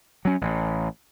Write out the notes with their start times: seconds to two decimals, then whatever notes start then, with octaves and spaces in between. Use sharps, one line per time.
0.25 F#3 C#4
0.41 A1